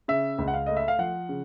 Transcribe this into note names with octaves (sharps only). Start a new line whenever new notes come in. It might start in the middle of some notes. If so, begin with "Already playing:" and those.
C#3 E5
C#2
F#5
F5
A3 D#5
E5
F5
F3 F#5
C#3